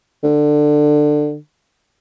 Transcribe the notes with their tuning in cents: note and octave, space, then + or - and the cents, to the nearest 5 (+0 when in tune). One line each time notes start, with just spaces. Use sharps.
D3 +20